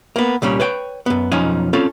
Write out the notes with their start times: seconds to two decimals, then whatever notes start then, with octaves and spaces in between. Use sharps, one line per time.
0.16 A#3 B3
0.42 C2 A#2 G3 C#4
0.60 B4 C#5 G5
1.06 F#2 B3
1.32 B1 F2 F3 C#4 D#4 G#5
1.73 C4 C#4 F4 A4